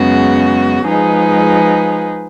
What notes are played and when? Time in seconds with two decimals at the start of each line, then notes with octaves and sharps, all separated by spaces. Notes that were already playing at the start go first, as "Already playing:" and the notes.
Already playing: F#2 C#3 G#3 B3 F#4
0.84 F3 G#3 D#4 G#4 B4